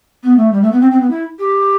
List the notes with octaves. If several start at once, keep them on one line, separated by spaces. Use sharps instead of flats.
B3
A3
G3
A3
B3
C4
C4
B3
E4
G4